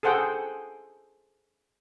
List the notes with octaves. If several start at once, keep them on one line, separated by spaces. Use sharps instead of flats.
G#4 A4 C5 F#5 G5